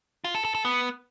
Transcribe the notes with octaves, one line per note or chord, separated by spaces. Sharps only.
F4
A4
A4
A4
B3